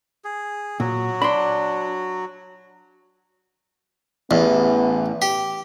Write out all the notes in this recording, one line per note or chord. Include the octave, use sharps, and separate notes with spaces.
G#4
A#2 F#3 F#4
D4 B5 C6
A1 E2 B3
G4